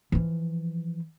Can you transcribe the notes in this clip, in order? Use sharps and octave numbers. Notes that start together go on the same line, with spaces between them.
E3 F3